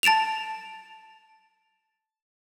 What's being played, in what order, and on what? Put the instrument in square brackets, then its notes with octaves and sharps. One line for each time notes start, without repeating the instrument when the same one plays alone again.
[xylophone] A5 A6 D7 E7 F7